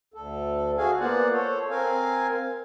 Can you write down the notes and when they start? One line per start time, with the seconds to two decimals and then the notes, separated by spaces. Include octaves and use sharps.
0.14 D2 A4
0.78 F#4 G#4 F5 G#5
1.00 A#3 B3 F4 C5 D5 F#5
1.33 A4 C5 C#5
1.70 C4 A#4 F5 G#5